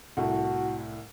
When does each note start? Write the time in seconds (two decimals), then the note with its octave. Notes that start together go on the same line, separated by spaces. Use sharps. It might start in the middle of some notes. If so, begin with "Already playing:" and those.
0.17 C2 A2 A3 F#4